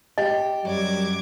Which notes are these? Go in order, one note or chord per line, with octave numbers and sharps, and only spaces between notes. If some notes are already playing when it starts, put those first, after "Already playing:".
G4 D#5
F#2 F#3 G3 D6 G#6